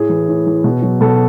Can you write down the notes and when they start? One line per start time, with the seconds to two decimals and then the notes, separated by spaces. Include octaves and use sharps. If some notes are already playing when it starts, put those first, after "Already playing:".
Already playing: A2 G#4
0.09 E3
0.29 A2
0.47 E3
0.64 B2
0.82 F#3
1.01 B2 A4